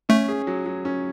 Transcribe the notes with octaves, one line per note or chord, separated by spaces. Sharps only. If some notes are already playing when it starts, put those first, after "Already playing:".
A3 C#4
G#4
F#3
F#3
C#4